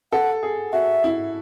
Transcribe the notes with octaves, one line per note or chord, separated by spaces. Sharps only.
A4 F#5
G#4
F#4 E5
E4